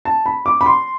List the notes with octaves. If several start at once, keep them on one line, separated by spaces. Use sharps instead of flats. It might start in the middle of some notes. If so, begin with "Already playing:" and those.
A5
B5
D6
B5
C6